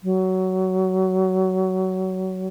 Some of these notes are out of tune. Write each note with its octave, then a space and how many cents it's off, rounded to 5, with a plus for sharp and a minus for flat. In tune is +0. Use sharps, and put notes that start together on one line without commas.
F#3 +20